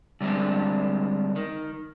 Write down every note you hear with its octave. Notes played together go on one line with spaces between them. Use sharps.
D3 G3 G#3 C4 D4
D#3